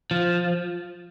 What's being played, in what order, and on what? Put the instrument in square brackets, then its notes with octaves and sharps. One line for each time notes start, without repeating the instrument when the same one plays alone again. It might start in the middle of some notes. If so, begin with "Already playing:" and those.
[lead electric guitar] F3